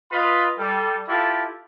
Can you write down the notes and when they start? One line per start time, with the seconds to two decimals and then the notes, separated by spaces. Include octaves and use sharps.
0.11 F4 B4 D#5 B5
0.57 G3 A4
1.08 E4 F4 G4 A4 A5